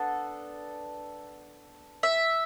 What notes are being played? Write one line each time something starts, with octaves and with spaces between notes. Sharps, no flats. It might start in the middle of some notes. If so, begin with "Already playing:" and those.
Already playing: B3 D4 A4 F#5
E5